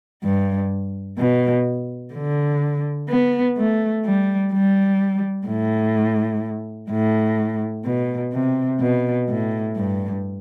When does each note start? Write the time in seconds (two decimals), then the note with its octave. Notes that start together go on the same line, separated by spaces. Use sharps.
0.24 G2
1.18 B2
2.14 D3
3.09 B3
3.57 A3
4.05 G3
4.53 G3
5.47 A2
6.91 A2
7.85 B2
8.33 C3
8.80 B2
9.29 A2
9.76 G2